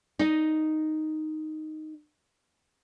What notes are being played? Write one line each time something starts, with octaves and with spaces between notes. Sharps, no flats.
D#4 D#5